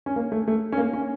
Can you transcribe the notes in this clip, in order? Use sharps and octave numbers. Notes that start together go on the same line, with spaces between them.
C#4
A#3
A3
A3
C#4
A#3
C#4